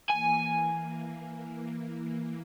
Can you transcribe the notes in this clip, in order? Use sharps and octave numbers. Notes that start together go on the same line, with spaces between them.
E3 A#3 G#5